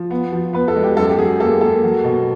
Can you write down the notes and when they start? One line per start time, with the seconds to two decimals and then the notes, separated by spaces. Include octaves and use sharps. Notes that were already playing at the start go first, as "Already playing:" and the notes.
Already playing: F3
0.11 B3
0.32 F3
0.53 B3 B4
0.68 A4
0.76 G#3
0.83 G4
0.97 F#2 A4
1.09 G4
1.18 F#3 G#4
1.40 A#3 A4
1.61 A#3 A4
1.83 F#3
2.04 B2